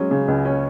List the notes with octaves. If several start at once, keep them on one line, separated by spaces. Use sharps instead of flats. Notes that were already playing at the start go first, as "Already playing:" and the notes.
Already playing: F#3 G#3 C#4
C#3
C#2
C#4